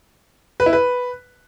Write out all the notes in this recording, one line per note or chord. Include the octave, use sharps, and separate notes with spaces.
B4
E4
B4